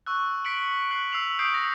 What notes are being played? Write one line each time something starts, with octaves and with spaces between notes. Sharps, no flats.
C#6 E6 F#6
B6 C#7 D7 F#7
F#6 C7 F#7
E6 C7 F7 F#7
D#6 E6 G6 C7 D7
A#6